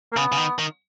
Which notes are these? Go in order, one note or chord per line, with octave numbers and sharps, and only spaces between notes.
A#3
C#3 B3
C#3
D#3
D#3